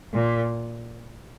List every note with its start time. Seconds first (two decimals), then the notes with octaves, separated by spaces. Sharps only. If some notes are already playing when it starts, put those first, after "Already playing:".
0.14 A#2